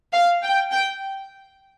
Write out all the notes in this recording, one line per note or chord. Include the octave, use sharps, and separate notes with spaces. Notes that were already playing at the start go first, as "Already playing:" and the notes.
F5
G5
G5